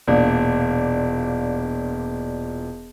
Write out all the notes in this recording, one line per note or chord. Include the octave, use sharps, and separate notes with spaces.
E1 A#2 D4